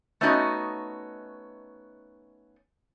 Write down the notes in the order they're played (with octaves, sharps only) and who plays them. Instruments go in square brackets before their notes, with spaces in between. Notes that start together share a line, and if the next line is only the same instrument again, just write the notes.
[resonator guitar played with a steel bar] A3 B3 C#4 D#4 F#4 D#5